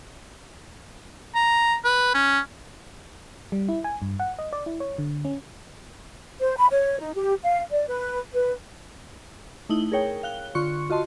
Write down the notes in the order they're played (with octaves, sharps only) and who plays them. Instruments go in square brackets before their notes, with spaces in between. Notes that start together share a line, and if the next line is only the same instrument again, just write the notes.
[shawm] A#5
B4
C#4
[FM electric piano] G3
E4
G#5
G2
F#5
D#5
D5
E4
C#5
D3
C#4
[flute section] C5
B5
C#5
D#4
G4
F5
D5
B4
B4
[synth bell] A3 D#4 E4 D#6 F#7 G7
G#4 A#4 C#5 G5
F5 F#6 G7
D3 F4 C6 C#6 F#6 C#7
F4 F#4 D#5 A5 C6